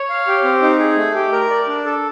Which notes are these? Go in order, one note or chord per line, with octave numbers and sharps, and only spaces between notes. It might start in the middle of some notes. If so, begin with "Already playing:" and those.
Already playing: C#5
F5
G4
C4
D#4
G#4
A3
G4
A#4
D5
D4
A4